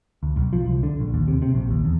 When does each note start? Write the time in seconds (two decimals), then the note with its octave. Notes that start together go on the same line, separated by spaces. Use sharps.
0.23 D2
0.36 B1
0.53 F3
0.65 C2
0.83 D3
1.00 A#1
1.14 D#2
1.28 C3
1.42 C3
1.55 A#1
1.71 D#2
1.85 E2